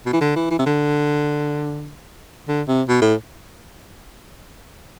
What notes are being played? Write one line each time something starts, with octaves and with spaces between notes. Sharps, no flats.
B2
E3
D3
E3
E3
C3
D3
D3
C3
B2
A2